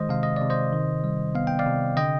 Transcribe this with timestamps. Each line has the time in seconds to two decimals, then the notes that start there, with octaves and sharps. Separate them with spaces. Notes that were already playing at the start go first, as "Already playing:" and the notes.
Already playing: D#3 G#3 C5 D#5
0.09 C3 F5
0.23 D#5
0.36 C3 D5
0.50 C5 D#5
0.73 D#3
1.04 G3
1.35 B3 F5
1.47 G5
1.59 D5 F5
1.66 C3
1.97 D3 D#5 G5